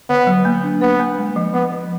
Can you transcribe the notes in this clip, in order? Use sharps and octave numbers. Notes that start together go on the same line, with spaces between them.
D3 B3
F#3
A#3
D4
B3 B4
A#3
G#3
F3
F3 B3
F3